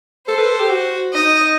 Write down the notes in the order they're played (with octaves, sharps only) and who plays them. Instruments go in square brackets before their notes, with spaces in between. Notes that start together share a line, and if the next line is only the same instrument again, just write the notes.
[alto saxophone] A4 [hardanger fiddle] C5
[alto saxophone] B4
A4
G4
F#4
[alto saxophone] D#4 [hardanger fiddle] D#5